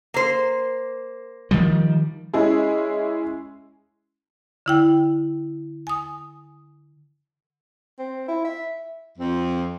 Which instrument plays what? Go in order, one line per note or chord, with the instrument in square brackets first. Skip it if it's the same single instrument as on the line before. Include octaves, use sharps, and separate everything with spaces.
[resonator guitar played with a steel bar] A#3 C5
[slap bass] D#3 F3 G3
[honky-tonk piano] G#3 C#4 E4 G#4
[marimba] D3 E4 G5
G#5 D#6
[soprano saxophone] C4
E4
E5
[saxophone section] F2 C4